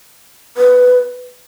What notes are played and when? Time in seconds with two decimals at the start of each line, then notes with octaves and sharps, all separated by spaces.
0.57 B4